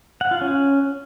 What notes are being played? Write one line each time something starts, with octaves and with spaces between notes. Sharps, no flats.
F#5
F4
C#4